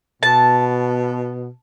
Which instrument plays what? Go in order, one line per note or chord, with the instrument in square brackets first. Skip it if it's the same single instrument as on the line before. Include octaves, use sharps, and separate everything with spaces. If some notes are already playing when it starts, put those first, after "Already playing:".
[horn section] B2 [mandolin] A5